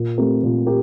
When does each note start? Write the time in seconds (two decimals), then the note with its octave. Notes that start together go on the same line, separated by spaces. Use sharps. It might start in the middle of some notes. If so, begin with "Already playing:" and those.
Already playing: A#2
0.18 A3 C4 G4 A#4
0.43 A#2
0.66 G4 A#4